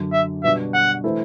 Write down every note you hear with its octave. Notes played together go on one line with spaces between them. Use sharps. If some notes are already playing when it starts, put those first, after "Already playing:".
Already playing: F#2 D3 F#3
E5
B2 G3 D4 F#4 E5
F#5
E3 A3 E4 A4 C5